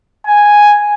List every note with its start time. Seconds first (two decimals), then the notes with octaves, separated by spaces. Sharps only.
0.26 G#5